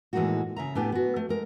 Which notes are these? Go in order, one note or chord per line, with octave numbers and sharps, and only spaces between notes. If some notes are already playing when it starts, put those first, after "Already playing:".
A2 E3 G#3 A#3 D#4 F#4
C#3 E5 A#5
A2 B3 D4 G4 G#5 A5
B3 F#4
A3
G#3 A#4